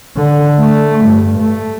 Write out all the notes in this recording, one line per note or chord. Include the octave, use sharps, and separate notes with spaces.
D3
A3
G2
A3